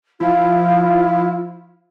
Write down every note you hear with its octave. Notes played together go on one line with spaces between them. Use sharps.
F3 E4 F4